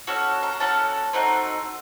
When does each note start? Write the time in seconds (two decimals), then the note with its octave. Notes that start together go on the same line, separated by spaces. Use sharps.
0.07 C#4 F#4 A4
0.43 A#5
0.60 C#4 F#4 A4 A5
1.13 A3 C4 D#4 F#4